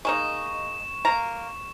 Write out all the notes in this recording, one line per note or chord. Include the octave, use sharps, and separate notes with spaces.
G#3 A#3 D#4 C#6 E7
A#3 A#5